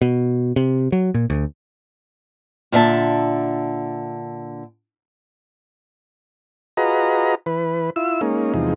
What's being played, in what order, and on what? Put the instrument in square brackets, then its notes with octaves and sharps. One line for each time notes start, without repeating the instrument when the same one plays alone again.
[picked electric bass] B2
C3
F#3
A#2
D2
[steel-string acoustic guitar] A#2 D3 E5 A5
[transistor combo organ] F4 F#4 G#4 B4 D#5 A#5
E3 B4
E4 F4 E6
G#3 A#3 C#4 D#4
E2 C3 F3 G#3 D#4